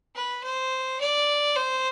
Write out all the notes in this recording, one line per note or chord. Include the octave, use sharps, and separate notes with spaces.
B4
C5
D5
C5